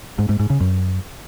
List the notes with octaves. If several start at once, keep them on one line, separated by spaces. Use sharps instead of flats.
G#2
G#2
G#2
C#3
F#2